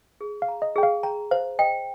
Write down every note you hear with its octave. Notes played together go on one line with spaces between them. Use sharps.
G#4
F5
A#5
D#5
G#4 G5
F5
G5 A#5
C5 F5
D#5 G5